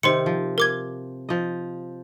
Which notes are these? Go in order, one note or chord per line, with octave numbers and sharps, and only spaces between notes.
C3 D#3 C5 C6 C#7
F3
A#4 D6 G#6
F3 D#5